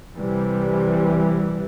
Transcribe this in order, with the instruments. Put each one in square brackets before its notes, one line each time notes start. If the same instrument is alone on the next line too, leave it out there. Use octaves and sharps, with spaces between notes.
[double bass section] C2 C3 E3 G3